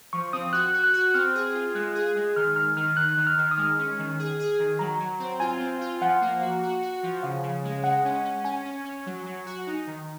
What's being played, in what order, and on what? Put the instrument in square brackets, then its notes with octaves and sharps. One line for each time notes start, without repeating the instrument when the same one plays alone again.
[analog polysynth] F3 [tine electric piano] C#6
[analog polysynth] C4 [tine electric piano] D#6
[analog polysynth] F#4 [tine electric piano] F#6
[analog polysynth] F#4
[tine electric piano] F#6
[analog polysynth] F#4
[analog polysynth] C4 [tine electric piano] F6
[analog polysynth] G#4
F4
[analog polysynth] G#3 [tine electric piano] F#6
[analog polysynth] G#4
G#3
[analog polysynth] D#3 [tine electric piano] F6
[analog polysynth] D#3 [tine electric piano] F6
[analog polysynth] D#3 [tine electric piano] F6
[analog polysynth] D#3 [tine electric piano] F#6
[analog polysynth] D#3
[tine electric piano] F6
[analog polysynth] D#3
[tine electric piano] D#6
[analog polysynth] G#3 [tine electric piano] F6
[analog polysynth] C#4
D#3
G#4
G#4
D#3
[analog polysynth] F#3 [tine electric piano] A#5
[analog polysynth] F#3
C4
[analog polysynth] F4 [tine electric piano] G#5
[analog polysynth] C4
F4
[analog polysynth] F3 [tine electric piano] F#5
[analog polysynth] A#3
F#4
F#4
F#4
F3
[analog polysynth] C#3 [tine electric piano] F5
[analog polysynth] C#3
G#3
[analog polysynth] G#3 [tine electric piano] F#5
[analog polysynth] C#4
C#4
[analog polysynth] C#4 [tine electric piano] G#5
[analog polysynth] C#4
C#4
F#3
F#3
F#4
D#4
D#3